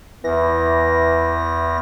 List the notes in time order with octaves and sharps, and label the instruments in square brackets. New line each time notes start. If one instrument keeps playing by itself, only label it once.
[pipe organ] E2 A#6 [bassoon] E3